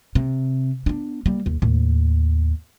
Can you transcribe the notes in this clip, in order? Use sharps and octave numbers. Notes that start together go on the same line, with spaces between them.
C3
B3 D4
G3 A#3
D#2
D#2 A2